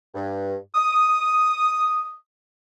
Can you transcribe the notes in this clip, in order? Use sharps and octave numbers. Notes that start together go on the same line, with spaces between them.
G2
D#6